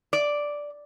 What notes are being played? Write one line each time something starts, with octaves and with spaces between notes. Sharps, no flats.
D5